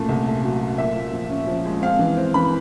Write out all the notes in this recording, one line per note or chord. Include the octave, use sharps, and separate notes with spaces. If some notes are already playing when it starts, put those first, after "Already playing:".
Already playing: F#2 A#2 A3
C2
A3
F#3
F#3
A#2 E5
A#2
F3
C#4
F3
G#3
C4 F5
E3
C4
E3 B5